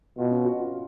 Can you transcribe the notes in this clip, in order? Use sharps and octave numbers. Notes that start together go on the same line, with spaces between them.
B2 F4
C#4
F#4
F4